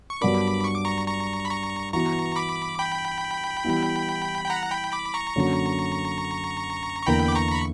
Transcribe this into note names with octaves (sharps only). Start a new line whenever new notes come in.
C#6
G2 F#3 B3 D4 A#4 B5 D6
C#6
D6
A#5 C#6
A#5 C#6
B5
A#5 C#6
E3 B3 F#4 A#5 C#6
B5 D6
G5 B5
E3 G3 B3 E4
G5
F#5 A#5
G5 B5
B5 D6
A#5 C#6
F#2 D3 F#3 A#3 C#4
C#6
E2 D3 A#3 E4 A#4 G5 B5
D6
A#5 C#6
B5